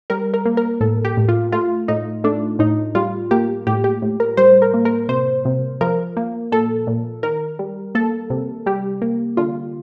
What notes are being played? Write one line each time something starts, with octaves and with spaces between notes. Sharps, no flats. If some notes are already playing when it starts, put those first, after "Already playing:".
G3 A#4
A#4
A#3
A#4
A2 A4
G4
A2
F4
A3 F4
A2 D#4
A3 D4
A2 D#4
G3 F4
A#3 G4
A2 G4
G4
A2
A#4
G3 C5
A#4
A#3
A#4
C3 C5
C3
F3 A#4
A#3
A#2 A4
A#2
D#3 A#4
G3
A#3 A4
C3
G3 G4
A#3
D3 F4